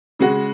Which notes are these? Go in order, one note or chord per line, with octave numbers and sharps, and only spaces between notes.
C#3 G#3 F#4